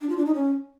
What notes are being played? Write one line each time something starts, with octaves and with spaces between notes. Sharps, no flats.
D4
F4
D4
D#4
C#4